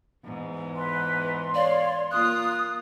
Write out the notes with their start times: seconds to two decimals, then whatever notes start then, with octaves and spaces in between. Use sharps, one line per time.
0.24 E2 G#2
0.75 B4 C6
1.54 C#5 D5 F5
2.11 A#3 F4 D#6 F#6